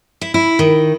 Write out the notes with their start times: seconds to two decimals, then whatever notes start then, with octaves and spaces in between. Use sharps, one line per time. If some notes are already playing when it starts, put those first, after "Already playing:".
0.21 E4
0.34 E4
0.59 D#3